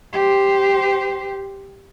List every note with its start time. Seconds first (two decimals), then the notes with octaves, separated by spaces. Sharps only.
0.13 G4 C5